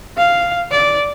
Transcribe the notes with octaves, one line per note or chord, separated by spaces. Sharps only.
F5
D5